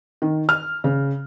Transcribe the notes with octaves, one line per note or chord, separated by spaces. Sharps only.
D#3
F6
C#3